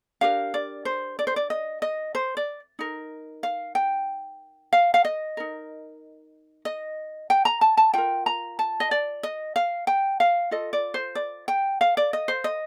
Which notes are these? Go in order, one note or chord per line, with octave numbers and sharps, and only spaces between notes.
D4 G4 A#4 F5
D5
C5
D5
C5
D5
D#5
D#5
C5
D5
D#4 A#4
F5
G5
F5
F5
D#5
D#4 A#4
D#5
G5
A#5
A5
A5
F4 A#4 G5
A#5
A5
D#5
D5
D#5
F5
G5
F5
F4 A4 D#5
D5
C5
D5
G5
F5
D5
D#5
C5
D#5